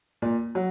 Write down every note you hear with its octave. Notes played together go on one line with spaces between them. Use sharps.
A#2
F#3